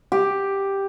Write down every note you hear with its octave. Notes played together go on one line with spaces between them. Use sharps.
G4